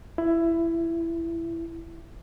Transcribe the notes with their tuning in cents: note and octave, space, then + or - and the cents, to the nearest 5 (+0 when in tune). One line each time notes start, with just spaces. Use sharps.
E4 +15